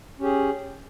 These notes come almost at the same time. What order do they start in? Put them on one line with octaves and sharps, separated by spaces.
C#4 G4 G#4